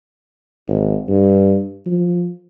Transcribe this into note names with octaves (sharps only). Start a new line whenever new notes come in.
G#1
G2
F3